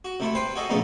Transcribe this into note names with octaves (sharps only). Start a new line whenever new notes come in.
F#4
C3 A3 E4
B4 C5 G5 C6
F#4 G#4 A4 D#5
A#1 C#3 A3 B3 D#4